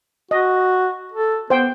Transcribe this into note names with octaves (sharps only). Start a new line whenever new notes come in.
F#4 D#5
A4
B3 C5 G5